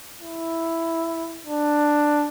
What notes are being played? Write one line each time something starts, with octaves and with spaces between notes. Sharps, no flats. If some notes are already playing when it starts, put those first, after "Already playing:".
E4
D4